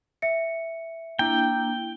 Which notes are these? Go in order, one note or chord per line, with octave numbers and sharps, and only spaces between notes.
E5 C#7
A#3 D4 E4 G5